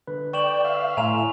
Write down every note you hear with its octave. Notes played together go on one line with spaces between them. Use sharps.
D3 B4
D5 G5 C#6 E7 F#7
E5 F5
A2 C#5 G#5 A#5 C6 F7